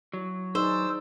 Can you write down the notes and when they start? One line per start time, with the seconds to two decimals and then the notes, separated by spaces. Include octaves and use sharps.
0.14 F#3 E4
0.55 D#4 G#4 C5 D5 E6